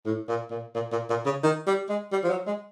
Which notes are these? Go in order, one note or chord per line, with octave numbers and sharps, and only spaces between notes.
A2
A#2
A#2
A#2
A#2
A#2
C#3
D#3
G3
G#3
G3
F3
F#3
G#3